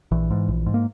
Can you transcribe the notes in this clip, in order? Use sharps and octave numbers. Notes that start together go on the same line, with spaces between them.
A#1 E3
G#2
A#1
G#2
A#3